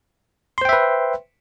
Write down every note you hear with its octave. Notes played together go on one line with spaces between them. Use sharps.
B4 C5 E5 G5 C6